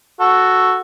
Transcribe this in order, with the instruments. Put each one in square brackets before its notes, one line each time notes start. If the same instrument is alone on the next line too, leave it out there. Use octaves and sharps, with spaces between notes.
[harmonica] F#4 A4